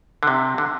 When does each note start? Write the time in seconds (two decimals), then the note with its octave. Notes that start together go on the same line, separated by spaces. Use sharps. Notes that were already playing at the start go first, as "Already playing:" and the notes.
0.23 D3
0.27 C3
0.58 D3